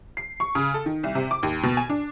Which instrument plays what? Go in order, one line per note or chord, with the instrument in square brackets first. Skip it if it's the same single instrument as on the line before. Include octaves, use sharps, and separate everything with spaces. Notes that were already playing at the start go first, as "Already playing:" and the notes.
[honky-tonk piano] C7
C#6
C#3
A4
D#3
C2
C3
D6
D#2
B2
G#5
D4